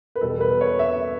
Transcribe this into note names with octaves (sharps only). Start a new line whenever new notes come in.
B4
E2 B2 G3 B3 A4
B4
C#5
E5